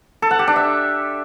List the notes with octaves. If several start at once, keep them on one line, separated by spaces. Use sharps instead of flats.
A4
F#5
G4
D4
E5